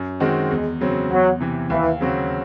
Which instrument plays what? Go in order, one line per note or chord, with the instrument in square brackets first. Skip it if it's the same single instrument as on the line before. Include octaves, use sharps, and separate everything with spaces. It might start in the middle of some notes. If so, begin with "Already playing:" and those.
Already playing: [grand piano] F#2
D#3 G#3 C4 F#4
[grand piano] E2 [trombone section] G#3
[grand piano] C#3 F#3 C4
[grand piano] E2 [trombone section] F#3
[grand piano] C3 E3
[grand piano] D#2 [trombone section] E3
[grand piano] C#3 F#3 C4 F#4